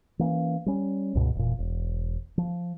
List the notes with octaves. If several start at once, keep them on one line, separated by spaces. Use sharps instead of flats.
E3 A#3 C#4
G3 C#4
C#2 G2 B2
E1 A#2
E1
F3